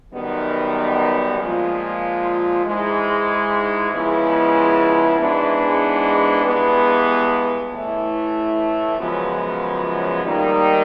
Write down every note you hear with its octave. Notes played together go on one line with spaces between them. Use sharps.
F#2 D#3 G3 B3
A#2 F3 G#3
G#2 E3 G#3
C#3 F3 G#3 B3 E4
G#2 E3 G#3 B3 D4
G2 E3 G#3 B3
A2 E3 A3
F#2 C#3 F3 G#3 B3
G#2 D#3 G3 A#3 D#4